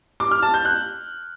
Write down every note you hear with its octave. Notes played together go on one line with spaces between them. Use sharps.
D6
F6
A5
G6
F#6